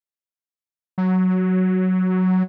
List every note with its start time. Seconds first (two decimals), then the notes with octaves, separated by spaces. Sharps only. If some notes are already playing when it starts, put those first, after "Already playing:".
0.98 F#3